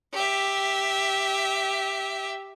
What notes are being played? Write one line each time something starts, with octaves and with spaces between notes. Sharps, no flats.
G4 E5